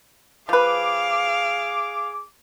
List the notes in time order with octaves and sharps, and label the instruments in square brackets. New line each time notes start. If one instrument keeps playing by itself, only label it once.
[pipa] F3 B4 [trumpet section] G#4 D6 [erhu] F5